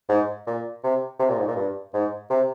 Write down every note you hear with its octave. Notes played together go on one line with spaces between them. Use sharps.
G#2
A#2
C3
C3
A#2
G#2
A#2
G2
G#2
C3